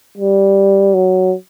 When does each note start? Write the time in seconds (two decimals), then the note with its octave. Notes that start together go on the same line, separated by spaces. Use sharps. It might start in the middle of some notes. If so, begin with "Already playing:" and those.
0.18 G3
0.94 F#3